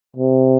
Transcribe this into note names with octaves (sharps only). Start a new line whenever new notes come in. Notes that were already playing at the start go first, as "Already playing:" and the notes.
C3